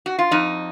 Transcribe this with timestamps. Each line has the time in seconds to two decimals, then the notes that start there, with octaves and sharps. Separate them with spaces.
0.06 F#4
0.19 F4
0.31 F2 D#4